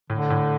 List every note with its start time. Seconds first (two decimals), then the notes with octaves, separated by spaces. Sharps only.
0.10 A2 D3
0.30 A2